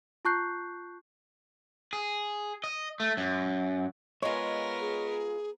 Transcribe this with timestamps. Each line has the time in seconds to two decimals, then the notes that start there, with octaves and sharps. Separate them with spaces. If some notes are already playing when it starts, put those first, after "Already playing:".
0.25 F4 A5 C#6 F#6 G6 C7
1.93 G#4
2.64 D#5
3.00 A3
3.17 F#2
4.22 G#3 B3 F4 A#4 C#5
4.81 G#4